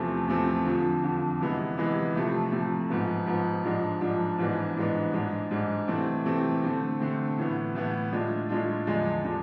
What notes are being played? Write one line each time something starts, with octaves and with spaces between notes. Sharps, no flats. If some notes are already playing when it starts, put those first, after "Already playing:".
Already playing: E2 C3 F3 A3 C4
E2 C3 F3 A3 C4
F2 D3 F3
F2 D3 F3
C3 E3 G#3 B3 E4
C3 E3 G#3 B3 E4
C2 C3 F3 A3
C2 C3 F3 A3
G#2 F3 B3
G#2 F3 B3
G#2 F3 G#3 D4
G#2 F3 G#3 D4
G#2 E3 G#3 B3 D4
G#2 E3 G#3 B3 D4
G#2 G#3 D4
G#2 G#3 D4
C3 E3 A3 C4
C3 E3 A3 C4
D3 A3 C4
D3 A3 C4
A2 E3 B3
A2 E3 B3
A2 G#3 D4 F4
A2 G#3 D4 F4
E2 D3 F3 G#3 D4
D3 F3 G#3 D4